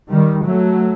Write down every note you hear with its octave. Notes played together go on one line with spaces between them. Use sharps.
D#3 G3
F#3 A3